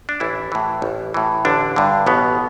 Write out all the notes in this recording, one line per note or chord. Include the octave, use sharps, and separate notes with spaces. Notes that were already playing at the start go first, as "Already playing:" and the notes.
D4
A1 E3 E4
A2 E3
A1
A2 E3
A1 D3 D4
G2 D3
A1 B2 B3